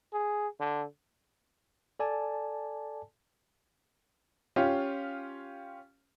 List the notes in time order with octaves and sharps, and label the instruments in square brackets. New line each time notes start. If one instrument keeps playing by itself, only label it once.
[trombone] G#4
D3
[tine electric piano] A4 D5 G#5 A5
[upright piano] C#4 F4 G4